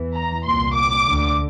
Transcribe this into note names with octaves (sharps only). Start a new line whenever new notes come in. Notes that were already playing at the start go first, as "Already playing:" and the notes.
Already playing: E2 E3
A#5
C2 A#2 C6
D6
D2 D3